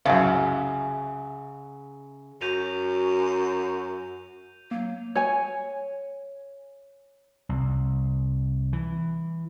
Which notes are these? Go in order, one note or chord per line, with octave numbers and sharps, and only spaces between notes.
C2 F#2 C#3
F#2 F#4 G6 D#7 F7
F#3 A#3
C#5 G#5
C2
E3